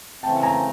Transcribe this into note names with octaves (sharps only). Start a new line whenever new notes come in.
C#3 E3 A3 C4 G5 A5
G#5 A#5